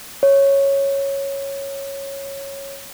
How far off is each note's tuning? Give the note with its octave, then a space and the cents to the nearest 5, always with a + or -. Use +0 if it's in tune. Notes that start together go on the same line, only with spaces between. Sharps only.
C#5 -5